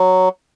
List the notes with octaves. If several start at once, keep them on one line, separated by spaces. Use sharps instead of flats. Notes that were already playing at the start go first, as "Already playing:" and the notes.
Already playing: F#3